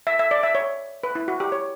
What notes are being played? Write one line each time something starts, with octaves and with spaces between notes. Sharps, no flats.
E5
E5
D5
E5
C#5
B4
E4
F#4
G4
C#5